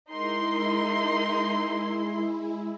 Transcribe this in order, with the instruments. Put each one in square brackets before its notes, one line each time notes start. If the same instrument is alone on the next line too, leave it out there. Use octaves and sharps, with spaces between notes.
[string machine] G#3 E4 [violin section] D#4 A#4 C6